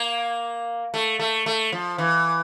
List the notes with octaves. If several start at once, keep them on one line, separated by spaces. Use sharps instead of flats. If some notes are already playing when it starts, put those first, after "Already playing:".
Already playing: A#3
A3
A3
A3
F3
E3